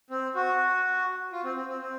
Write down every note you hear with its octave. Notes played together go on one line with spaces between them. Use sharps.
C4
F#4
F4
C4
C4
C4
C4